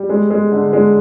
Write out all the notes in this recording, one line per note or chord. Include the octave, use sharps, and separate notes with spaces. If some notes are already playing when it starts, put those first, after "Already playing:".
Already playing: G3
G#3
G#3
D3
G#3